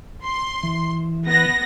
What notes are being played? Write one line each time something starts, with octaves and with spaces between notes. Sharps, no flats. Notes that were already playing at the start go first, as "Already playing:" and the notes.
C6
E3
B3 A#6